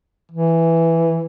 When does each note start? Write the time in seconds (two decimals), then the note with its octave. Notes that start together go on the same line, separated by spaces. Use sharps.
0.32 E3